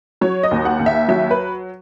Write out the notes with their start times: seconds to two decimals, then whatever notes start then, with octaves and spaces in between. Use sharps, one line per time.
0.21 F#3 C#5
0.43 D#5
0.51 D#2
0.65 F#5
0.79 D#2
0.86 E5
1.08 F#3 E5
1.31 B4